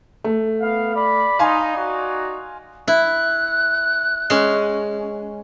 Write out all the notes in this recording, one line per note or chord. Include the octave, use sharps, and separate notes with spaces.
A3
B3 F5
D5 B5
D#4 F5 G#5 C6
D#4 F#4 D5
E4 F#6
G#3 C#4